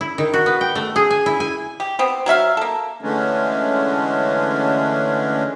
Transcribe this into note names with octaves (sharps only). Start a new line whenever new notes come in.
E4
D#3
F#4
B3
G5
A3
G#4
G#5
E4
G#5
G4
B3 C4
F#3 F#4 E5 F5
A#3 A4
D3 E3 G#3 A3 C#4 D4